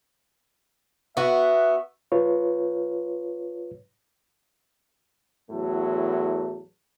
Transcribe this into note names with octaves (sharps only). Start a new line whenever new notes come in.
B3 F#4 E5
F4 B4 C#5
E2 A2 F#3 A4